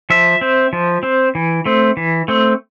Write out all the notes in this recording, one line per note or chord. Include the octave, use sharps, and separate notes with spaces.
F3 E5
C4
F3
C4
E3
A3 C4
E3
A3 C4